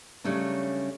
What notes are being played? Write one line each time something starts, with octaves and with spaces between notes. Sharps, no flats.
C#3 F#3 G3 A3 C#4 D4